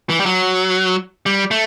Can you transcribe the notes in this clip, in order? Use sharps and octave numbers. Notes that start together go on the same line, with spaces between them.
E3
G3
F#3
G3
A3